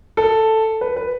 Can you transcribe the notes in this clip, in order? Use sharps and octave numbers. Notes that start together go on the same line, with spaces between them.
A4
B4
B4